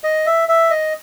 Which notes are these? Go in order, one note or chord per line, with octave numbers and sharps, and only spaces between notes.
D#5
E5
E5
D#5